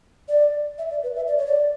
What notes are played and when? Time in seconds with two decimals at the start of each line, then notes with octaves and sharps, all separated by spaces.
0.28 D5
0.78 E5
0.91 D5
1.03 B4
1.16 E5
1.28 D5
1.38 C#5
1.47 D5